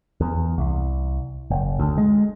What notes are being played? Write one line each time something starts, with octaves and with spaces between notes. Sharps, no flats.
E2
C2
F#1
D2
G#3